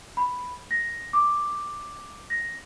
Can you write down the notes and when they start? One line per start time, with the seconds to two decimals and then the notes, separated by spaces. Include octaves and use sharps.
0.17 B5
0.71 A#6
1.13 D6
2.30 A#6